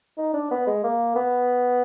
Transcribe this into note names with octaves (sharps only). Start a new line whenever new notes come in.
D#4
D4
B3
G#3
A#3
B3